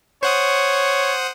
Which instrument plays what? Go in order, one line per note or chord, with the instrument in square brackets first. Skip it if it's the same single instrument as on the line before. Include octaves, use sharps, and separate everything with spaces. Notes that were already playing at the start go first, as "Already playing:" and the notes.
[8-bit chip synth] C5 F#5 D#6 [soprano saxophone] C#5